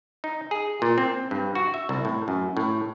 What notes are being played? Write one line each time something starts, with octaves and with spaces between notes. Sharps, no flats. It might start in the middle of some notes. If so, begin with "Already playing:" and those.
D#4
G#4
A#2
C4
G2
F#4
E5
C2
A2
F#2
A2